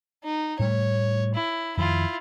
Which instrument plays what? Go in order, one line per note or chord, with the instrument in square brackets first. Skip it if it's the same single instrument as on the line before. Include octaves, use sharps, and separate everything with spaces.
[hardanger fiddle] D#4
[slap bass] A2 G3 A3 [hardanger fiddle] C#5
[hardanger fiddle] E4
[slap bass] F2 D#3 [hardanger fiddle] E4 F4